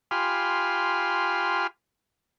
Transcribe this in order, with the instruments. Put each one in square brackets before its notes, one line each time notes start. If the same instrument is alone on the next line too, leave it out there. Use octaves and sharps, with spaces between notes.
[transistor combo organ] F4 G4 G#5 B5 C6 F6